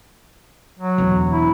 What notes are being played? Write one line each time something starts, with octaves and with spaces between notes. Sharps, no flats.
F#3
E1 E3
E4